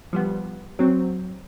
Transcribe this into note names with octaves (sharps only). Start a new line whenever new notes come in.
F3 G3 B3
F#3 C4